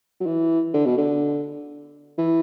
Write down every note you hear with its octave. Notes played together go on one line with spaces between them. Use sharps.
F#3
E3
D3
B2
D3
E3